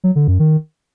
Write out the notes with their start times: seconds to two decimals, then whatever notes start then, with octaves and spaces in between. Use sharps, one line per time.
0.04 F#3
0.16 D3
0.27 F#2
0.39 D#3